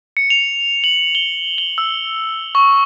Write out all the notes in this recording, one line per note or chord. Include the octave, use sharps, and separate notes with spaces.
C#7
F7
F#7
G7
G7
E6
C#6